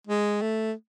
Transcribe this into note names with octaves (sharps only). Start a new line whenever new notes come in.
G#3
A3